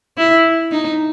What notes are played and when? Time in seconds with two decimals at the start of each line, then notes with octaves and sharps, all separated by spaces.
0.18 E4
0.72 D#4